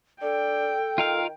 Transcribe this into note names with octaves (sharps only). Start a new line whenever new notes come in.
D4 A4 G5
D#3 F4 A#4 F5